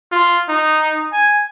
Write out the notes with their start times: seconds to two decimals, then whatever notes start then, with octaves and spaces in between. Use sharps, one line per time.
0.12 F4
0.49 D#4
1.13 G#5